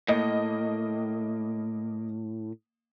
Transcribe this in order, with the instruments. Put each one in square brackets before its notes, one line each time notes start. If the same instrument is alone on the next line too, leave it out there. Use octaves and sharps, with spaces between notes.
[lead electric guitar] A2 [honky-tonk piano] A#3 D#5